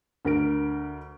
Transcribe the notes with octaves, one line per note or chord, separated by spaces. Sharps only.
D2 A#4 D7